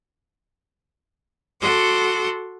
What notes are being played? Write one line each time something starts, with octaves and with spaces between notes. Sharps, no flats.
F#4 A4 F#5 C6 D6